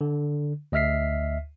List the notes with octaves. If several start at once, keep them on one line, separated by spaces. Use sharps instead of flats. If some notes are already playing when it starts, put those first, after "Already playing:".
D3
D2 D#5 E5 F6 B6 C7